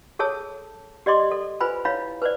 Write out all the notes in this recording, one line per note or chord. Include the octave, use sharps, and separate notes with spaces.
G#4 A4 C#5 A5 E6
G4 D5 D#5 C6 D6
A4
F4 B4 C5 G#5 B5
E4 C#5 F5 B5
B4 C5 D5